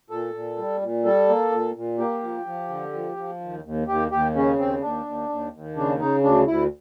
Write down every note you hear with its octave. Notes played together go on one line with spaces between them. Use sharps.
A#2 A4
A#2
G3
A#2
G3 A4
A#3
A#2
A#2
A#3 G4
F3
F3
D3
F3
F3
D#2
D#2
D#2 G4
D#2 G4
C#3 C#4
D#2 C4
D#2 D4
D#2
D#2
D#2
C#3 D4
C#3 D#4
D2 D4
D2 E4